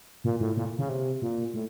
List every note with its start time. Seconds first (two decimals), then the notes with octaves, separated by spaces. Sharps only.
0.24 A#2
0.40 A2
0.57 A#2
0.78 C#3
0.89 C3
1.22 A#2
1.54 A2